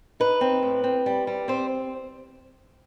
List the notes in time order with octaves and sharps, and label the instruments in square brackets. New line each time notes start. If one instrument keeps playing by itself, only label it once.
[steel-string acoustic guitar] D#4 B4
C4
A2
C4
G3
G3
C4 C5